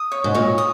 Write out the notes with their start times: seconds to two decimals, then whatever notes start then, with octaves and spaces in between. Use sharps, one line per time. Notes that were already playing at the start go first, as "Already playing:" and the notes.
Already playing: D#6
0.12 C#5
0.24 G#2
0.35 A#2 C#5
0.58 D#6